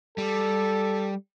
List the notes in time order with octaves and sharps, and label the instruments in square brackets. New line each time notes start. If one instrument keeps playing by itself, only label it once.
[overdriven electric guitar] G3 [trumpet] A4